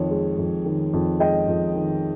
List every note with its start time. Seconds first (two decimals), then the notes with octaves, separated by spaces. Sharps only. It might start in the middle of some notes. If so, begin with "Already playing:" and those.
Already playing: F2 D#3 C#5
0.11 G#3
0.38 F2
0.65 D#3
0.93 F2
1.20 G#3 D#5 G5
1.48 F2
1.75 D#3